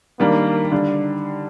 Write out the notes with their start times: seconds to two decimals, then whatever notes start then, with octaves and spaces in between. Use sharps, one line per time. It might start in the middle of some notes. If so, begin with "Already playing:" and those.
0.20 D#3 G3 A#3 D4
0.72 D3 G3 D4